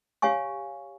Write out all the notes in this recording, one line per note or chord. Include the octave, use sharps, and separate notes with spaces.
G4 C#5 F5 G#5 C#6